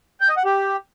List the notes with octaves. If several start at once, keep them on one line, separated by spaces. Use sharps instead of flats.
G5
D#5
F#5
G4